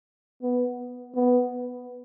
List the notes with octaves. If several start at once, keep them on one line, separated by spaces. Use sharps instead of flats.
B3
B3